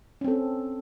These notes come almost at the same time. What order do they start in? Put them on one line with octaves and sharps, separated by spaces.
C#4 C4 A4